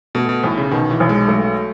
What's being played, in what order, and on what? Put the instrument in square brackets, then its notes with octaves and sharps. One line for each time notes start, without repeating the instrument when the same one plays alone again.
[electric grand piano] B2 [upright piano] A3
[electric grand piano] B2
[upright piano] B1 [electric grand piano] A2
[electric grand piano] C#3
[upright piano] B2 [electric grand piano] D#3
[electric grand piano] E3
[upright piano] B1
[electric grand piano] G#3
[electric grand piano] F#3 [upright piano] A3